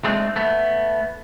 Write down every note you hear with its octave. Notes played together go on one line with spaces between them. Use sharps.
G#3 A3 C4 D4
A3 B3